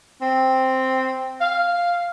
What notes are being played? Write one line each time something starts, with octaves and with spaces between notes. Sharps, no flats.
C4
F5